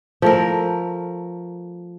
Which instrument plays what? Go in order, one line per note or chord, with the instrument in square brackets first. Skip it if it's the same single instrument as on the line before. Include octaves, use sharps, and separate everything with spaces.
[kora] F3 A3 A#4